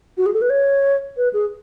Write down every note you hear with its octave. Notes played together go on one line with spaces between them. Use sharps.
F#4
G#4
A4
B4
C#5
B4
G#4